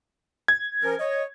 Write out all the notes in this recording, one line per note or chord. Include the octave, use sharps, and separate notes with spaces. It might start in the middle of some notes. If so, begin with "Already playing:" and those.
G#6
F3 C#4 A#4
C#5 D#5